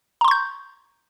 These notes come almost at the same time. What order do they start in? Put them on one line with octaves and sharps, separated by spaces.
A#5 C6 C#6 G6